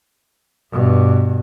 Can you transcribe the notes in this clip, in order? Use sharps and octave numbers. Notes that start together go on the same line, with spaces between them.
G2 B2